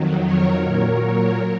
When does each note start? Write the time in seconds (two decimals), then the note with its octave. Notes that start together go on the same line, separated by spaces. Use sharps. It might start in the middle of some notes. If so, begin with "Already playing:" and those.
Already playing: F2 D#3 F#3
0.24 A#4 C#5
0.62 A#2 F#3 A#4 C#5